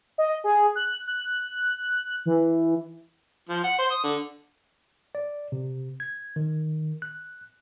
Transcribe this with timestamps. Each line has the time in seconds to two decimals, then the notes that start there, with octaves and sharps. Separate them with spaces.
0.18 D#5
0.44 G#4
0.75 F#6
1.07 F#6
2.26 E3
3.49 F3
3.64 F#5
3.78 C5
3.91 D#6
4.03 D3
5.15 D5
5.52 C3
6.00 G#6
6.36 D#3
7.02 F#6